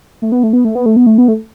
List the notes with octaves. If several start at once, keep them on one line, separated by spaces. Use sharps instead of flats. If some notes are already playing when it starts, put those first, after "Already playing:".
A3
B3
A3
B3
A3
B3
A3
B3
A3
B3
A3